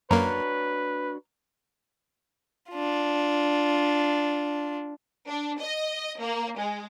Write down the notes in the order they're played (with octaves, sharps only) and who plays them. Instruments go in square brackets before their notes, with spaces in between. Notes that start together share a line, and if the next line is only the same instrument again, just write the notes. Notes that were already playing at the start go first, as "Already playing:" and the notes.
[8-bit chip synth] F#2 A#3 [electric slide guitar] D4 F#4 C#5 [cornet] B4 [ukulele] A#5
[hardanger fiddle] D4 F4
[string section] D4
D#5
A#3
G#3